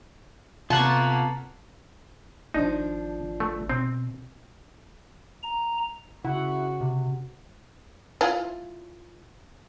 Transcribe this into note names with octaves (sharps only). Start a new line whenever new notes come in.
C3 A#3 B3 F4 A4 F#5 A5 C#6
G#1 F3 D4 D#4
A3
B2 C4
A#5
C#3 E4 F#4 F#5
C3
E4 F4